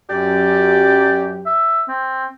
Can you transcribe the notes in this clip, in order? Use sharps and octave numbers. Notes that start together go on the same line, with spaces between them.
F#2 G4 D5
E5
C4